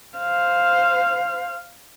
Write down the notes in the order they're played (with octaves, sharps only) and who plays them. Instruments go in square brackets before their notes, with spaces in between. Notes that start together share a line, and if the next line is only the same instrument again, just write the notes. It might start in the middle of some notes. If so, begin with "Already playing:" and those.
[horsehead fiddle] C5 F5